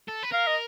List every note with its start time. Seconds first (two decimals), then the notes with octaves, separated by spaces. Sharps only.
0.08 A4
0.23 B4
0.32 A#4 F5
0.47 D#5